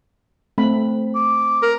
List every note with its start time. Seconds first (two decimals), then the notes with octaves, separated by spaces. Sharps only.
0.58 A3 C4 B5
1.15 D6
1.63 A#4